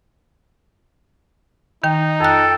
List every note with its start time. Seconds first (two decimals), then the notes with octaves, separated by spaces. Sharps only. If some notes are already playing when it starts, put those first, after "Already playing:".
1.84 D#3 D#4 G5
2.21 F2 A4 G5 F#6